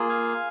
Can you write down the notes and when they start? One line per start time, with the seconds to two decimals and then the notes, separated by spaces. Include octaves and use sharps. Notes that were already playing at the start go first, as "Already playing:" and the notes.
Already playing: A#3 F4 G#4
0.09 F5 G#5